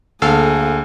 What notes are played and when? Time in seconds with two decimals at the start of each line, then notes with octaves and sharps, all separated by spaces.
0.22 D2 A#3 G#4 A4 F5